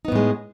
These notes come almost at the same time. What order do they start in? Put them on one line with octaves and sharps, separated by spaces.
D#4 B3 A2 G#3